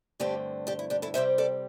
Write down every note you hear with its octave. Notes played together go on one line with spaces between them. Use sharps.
G2 D3 A3 C4 D4 G4
D4 G4
E4
D4 G4
E4 A4
C3 G3 C4 C5 E5
A4 D5